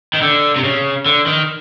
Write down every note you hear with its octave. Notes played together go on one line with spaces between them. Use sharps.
D#3
D3
C3
C#3
D3
D#3